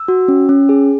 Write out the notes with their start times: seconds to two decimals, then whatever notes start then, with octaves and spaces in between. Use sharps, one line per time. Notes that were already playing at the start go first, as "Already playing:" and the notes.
Already playing: E6
0.08 F#4
0.28 C#4
0.49 C#4
0.69 G#4